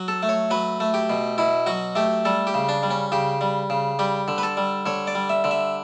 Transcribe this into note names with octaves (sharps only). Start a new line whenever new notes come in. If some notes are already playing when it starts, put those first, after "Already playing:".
Already playing: F#3
A4
A3
C#5
F#3 B4
A3
G4
B2
B2 E4
F#3 F#4
A3 G4
G3 A4
G4
C#3
D4
G3
C#4
C#3 G4
G3
C#3
G3 G4
D3
B4
A4
G3
D3 C#5
D5
G3
E5
D3
E5